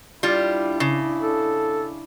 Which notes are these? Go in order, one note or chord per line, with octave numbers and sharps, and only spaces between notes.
G3 D4 E4 F4
C#3
A4